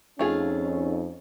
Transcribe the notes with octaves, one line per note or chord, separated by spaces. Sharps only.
F2 A3 C#4 D#4 F4 G#4